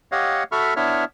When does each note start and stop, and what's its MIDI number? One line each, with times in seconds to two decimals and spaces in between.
0.12 0.43 67
0.12 0.43 73
0.12 0.43 75
0.12 0.43 77
0.12 0.43 78
0.52 0.74 66
0.52 0.74 69
0.52 0.74 76
0.52 0.74 83
0.52 0.74 85
0.52 0.74 89
0.76 1.04 59
0.76 1.04 62
0.76 1.04 64
0.76 1.04 73
0.76 1.04 76
0.76 1.04 89